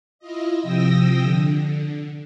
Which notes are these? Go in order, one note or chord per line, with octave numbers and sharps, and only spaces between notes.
E4 F4 D#5
C3 F3 G5 D#6 E6 A#6
D3